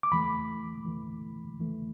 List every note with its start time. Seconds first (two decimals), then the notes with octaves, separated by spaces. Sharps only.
0.03 D6
0.12 E2 E3 A3 B5
0.85 E2 E3 A3
1.58 E2 E3 A3